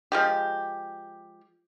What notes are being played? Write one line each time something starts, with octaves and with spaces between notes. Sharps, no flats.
F3 G#3 G4